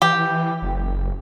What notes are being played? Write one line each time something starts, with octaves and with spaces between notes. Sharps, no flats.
E3 G4
F#1